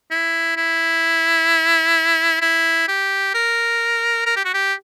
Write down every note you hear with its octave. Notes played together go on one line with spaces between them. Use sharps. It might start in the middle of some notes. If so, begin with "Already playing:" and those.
E4
E4
E4
G4
A#4
A#4
G4
F#4
G4